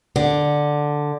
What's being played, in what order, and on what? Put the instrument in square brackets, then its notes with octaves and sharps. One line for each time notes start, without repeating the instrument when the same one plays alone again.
[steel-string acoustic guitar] D3